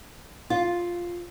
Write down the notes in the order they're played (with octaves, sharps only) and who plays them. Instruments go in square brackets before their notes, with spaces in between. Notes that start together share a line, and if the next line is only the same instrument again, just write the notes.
[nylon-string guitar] F4